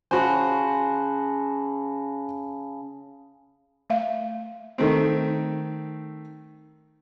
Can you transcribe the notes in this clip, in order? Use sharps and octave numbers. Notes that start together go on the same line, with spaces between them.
C#3 F#4 C5 G#5 A5 B5
A3 E5 F5
D#3 A3 C4